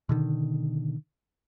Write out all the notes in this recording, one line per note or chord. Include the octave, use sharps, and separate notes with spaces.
B2 D3 D#3